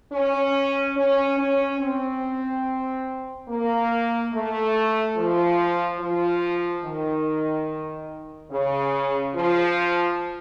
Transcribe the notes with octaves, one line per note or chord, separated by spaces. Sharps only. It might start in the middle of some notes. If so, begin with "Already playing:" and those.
C#4
C#4
C#4
C4
A#3
A3
F3
F3
D#3
C#3
F3